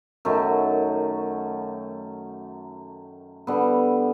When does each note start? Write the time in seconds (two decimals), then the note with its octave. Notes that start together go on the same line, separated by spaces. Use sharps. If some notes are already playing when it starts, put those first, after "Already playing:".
0.25 F#2 D#3 F#3 A3
3.47 D3 G3 B3